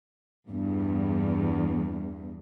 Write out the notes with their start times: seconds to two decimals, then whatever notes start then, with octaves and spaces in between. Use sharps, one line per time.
0.48 E2 G2